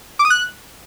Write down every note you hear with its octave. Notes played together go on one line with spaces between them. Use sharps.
D6
D#6
F#6